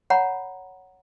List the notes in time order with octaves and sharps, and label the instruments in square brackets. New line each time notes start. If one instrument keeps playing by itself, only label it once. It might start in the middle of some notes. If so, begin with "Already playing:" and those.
[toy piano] C#5 F#5 A#5 B5